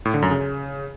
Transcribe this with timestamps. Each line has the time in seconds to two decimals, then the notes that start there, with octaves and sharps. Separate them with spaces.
0.05 A2
0.14 D3
0.22 F#2
0.31 C#3